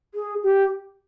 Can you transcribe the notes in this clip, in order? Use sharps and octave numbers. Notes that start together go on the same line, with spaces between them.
G#4
G4